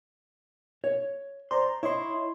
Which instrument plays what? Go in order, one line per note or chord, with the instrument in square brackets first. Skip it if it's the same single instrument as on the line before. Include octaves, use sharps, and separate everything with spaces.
[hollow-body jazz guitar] C#5
[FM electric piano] C5 D5 A#5 [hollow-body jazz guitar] C6
[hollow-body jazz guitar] E4 [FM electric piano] C#5 D#5 C6